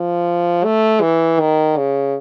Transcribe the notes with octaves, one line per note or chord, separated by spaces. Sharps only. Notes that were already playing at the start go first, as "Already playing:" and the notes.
Already playing: F3
A3
E3
D#3
C#3